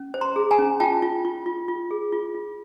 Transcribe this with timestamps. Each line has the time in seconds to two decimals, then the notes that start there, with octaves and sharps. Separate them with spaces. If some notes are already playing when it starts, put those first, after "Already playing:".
Already playing: C#4
0.14 C5
0.21 A#5 C6
0.36 G#4
0.51 G#5 A#5
0.59 C#4
0.80 F4 G5 A5
1.02 F4
1.25 F4
1.46 F4
1.68 F4
1.91 G#4
2.12 F4
2.35 F4